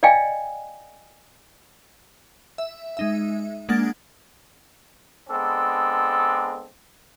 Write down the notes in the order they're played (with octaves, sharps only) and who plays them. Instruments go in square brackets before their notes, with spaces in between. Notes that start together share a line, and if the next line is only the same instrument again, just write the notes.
[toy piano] D5 D#5 F5 G5 G#5
[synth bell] E5
G#3 D#4 E5
G#3 A#3 D4 F#5 G#6 A6
[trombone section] G#3 B3 C4 D4 A4